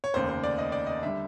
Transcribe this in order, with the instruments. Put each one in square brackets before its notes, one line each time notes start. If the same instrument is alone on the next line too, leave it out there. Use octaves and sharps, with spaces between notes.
[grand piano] C#5
F1 D#2 C#3 C5
C5
D5
D#5
D5
D#5
D3 G3 E5